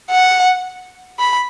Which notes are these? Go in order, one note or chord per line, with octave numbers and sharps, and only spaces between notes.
F#5
B5